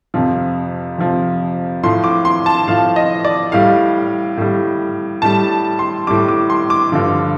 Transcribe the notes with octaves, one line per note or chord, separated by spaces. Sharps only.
F2 C3 F3
F2 C3 F3
A2 F3 C6
D6
C6
A5
A2 F3 F5
D#5
D5
A2 G3 F5
A2 G3
A2 G3 A5
C6
A2 G3 D6
D6
C6
D6
G2 D3 F3